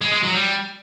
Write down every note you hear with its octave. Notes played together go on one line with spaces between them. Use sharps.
G#3
G#3
F#3
G3